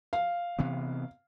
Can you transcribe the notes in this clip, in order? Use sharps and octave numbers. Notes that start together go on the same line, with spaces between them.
F5
C3 E3 B3